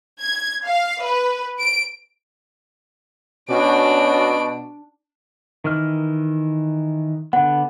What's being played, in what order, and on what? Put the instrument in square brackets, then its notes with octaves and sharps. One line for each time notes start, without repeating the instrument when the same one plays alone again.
[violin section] G#6
F5
B4
D7
[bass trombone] B2 [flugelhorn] C#4 [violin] D4 D7 [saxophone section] F#4 D5
[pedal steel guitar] D#3 E3 F6
[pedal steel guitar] D3 B3 [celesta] F#5